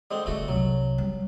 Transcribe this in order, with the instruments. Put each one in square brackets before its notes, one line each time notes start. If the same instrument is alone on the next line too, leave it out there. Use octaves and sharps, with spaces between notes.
[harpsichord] D3 G#3 C4
[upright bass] D3 G#3 [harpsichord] A3 F#4
[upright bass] C2 C3 [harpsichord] F#3
[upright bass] G3